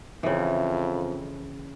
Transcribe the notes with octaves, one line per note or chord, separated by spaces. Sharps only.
F2 C#3 E3